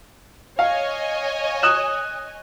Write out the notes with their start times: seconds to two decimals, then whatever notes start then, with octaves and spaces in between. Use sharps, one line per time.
0.59 C#5 D#5 F5 G#5
1.63 D#6 F#6 E7